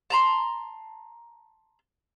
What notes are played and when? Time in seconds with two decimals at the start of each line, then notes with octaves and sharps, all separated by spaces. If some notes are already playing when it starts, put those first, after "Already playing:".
0.10 A5 A#5 C6